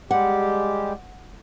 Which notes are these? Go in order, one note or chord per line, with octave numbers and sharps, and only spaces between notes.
G3 G#3 G4 F#5